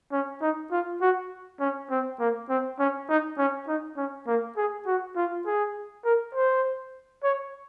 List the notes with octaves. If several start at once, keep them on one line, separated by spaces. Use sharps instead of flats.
C#4
D#4
F4
F#4
C#4
C4
A#3
C4
C#4
D#4
C#4
D#4
C#4
A#3
G#4
F#4
F4
G#4
A#4
C5
C#5